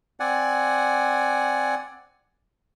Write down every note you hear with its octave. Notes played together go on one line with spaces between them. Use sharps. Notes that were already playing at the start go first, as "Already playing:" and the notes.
C4 D5 F#5 G#5